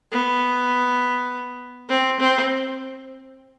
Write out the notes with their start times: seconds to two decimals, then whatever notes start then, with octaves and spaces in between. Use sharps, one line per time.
0.12 B3
1.89 C4
2.20 C4